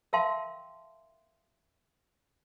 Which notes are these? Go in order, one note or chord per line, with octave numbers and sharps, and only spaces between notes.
A#4 E5 F5 G5 A5 C6